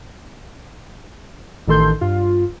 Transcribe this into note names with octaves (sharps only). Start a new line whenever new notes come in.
A1 D#3 A4 C6 G6
G2 F4